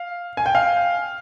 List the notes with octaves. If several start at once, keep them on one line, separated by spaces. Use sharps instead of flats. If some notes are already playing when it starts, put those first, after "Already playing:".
Already playing: F5
G#5
G5
F5